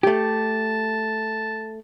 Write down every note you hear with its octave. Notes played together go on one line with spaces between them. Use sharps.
A3 G4 A5